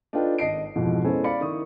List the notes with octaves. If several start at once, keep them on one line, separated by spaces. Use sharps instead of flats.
D4 D#4 F4 A4 B4 G5
G#1 D#5 A5 C7 D7
F2 G#2 B2 E3 F3
G#3 B3 C#4 E4 A4 C5
D5 F5 B5 C#7
D#3 E4 C#6 D#6